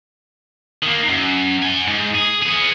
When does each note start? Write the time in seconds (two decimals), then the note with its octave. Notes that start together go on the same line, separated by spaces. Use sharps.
0.83 D#3 A#3
1.09 F#2
1.63 F#5 G#5
1.88 G#2
2.15 G#4
2.43 B3 G#4